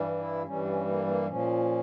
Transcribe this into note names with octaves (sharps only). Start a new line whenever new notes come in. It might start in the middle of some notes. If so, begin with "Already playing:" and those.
Already playing: G2 E3 G3
E4
G2 E3 G3 C#4
C#4
A#3
A#3
A#2 F3 C#4